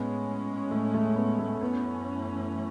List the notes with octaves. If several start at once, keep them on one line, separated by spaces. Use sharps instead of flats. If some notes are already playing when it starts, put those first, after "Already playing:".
Already playing: A2 G#3 B3 C#4
A3
A3
B3
A3
F#2 E3 A3 B3 C#4